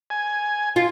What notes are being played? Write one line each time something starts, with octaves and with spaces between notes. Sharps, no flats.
G#5
F4